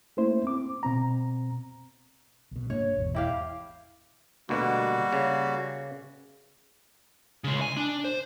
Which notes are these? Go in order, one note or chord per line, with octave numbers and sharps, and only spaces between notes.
A3 A#3 C#4 E4 C5
C4 D6
B2 C4 A#5
B1 B2
G#2 A#3 D4 C#5
G#1 E2 B2
E4 G4 F5
D2 B2 G3 A#3 F#4
C#3
C#3 G#3
G#5
D4
C5